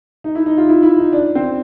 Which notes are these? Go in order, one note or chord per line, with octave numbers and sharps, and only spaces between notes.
D#4
E4
D#4
F4
E4
E4
D#4
D4
C4